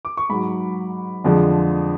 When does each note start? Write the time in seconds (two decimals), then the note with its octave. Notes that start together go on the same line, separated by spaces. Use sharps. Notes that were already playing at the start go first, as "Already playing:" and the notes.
0.05 D6
0.17 C#6
0.29 G#2 F#3 B5
1.24 F2 D3 F3 G#3